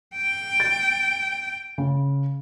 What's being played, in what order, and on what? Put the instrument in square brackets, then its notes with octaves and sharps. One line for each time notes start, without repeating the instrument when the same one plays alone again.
[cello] G5
[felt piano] A6
C#3